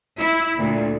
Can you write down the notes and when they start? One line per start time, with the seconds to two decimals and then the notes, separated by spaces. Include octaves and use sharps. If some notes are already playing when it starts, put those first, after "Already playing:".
0.19 E4
0.58 D2 A#2